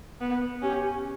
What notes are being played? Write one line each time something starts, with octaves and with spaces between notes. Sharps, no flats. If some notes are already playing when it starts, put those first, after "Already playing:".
B3
C#4 G4